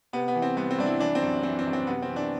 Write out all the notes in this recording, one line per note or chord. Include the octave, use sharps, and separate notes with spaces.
C3 B3
B3
E3
C4
C2 B3
C4
C2 D4
E4
E3 D4
C4
F#2
E3 C4
C4
F#2
C4
C3 B3
C4
E3
D4